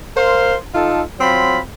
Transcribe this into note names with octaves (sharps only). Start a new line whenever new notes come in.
A#4 C5 F5 C6
D#4 F4 A4
F#3 C4 F4 B5